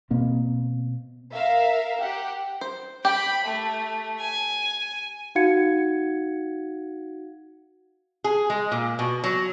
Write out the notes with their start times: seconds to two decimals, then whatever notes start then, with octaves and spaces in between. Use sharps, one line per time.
0.10 B2 A#3 C4
1.33 A#4 E5 F5
2.01 G4 F#5
2.61 C5
3.05 G4 G5 B5
3.45 A3
4.20 G#5
5.35 D#4 F#4 F5 F#5 G#6 C#7
8.24 G#4
8.50 G#3
8.72 A#2
8.99 B2
9.24 F#3